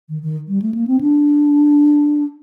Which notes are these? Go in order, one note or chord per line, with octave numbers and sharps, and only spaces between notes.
D#3
D#3
G3
A3
A#3
C4
D4